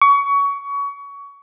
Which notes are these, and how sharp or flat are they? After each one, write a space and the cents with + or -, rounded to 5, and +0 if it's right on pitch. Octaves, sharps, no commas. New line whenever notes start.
C#6 +25